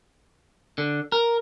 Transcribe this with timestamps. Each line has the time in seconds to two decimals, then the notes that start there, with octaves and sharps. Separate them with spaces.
0.78 D3
1.12 A#4